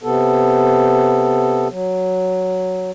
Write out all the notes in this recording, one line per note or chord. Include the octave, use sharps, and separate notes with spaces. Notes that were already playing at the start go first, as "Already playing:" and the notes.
C3 B3 A4
F#3